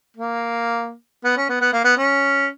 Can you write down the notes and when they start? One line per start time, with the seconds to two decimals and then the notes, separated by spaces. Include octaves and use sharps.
0.17 A#3
1.24 B3
1.37 C#4
1.49 B3
1.61 B3
1.73 A#3
1.84 B3
1.97 C#4